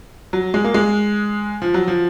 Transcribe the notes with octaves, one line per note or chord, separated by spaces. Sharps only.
F#3
G#3
A#3
G#3
F3
F#3
F3